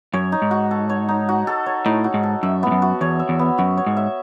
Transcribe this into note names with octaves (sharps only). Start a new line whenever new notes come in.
F#2 C#5
D#4
G#2
F#4
A4
C#5
D#4
F#4
A4
C#5
A2 D#4
F#4
G#2
A4
F#2 E5
G#2 B3
F#2
F#4
E2 C#5
E5
E2
B3
F#2 F#4
C#5
G#2
E5